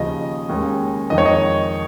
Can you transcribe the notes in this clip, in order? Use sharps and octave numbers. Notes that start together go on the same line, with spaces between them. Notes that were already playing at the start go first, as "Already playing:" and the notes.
Already playing: D#2 C#3 F3 D#5
D#2 D#3 G#3 C#4
F2 D#3 G#3 D#5
C#5
D#5